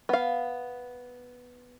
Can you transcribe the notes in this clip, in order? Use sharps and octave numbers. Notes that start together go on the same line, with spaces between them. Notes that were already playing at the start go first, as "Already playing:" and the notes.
B3 F5